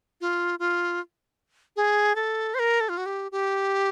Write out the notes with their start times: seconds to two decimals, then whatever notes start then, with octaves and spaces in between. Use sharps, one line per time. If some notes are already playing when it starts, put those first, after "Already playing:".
0.21 F4
0.59 F4
1.76 G#4
2.15 A4
2.54 C5
2.59 A#4
2.80 A4
2.89 F4
2.97 F#4
3.06 G4
3.32 G4